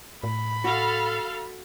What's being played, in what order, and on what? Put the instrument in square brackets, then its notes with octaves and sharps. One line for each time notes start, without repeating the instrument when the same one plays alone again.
[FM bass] A2 [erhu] B5
[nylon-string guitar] F#4 [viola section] A4 F5